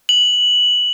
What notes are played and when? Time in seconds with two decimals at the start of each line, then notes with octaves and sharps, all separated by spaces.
0.09 F#7